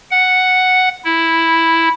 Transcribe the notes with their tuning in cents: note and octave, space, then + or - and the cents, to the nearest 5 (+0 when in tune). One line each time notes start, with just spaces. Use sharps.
F#5 +0
E4 -5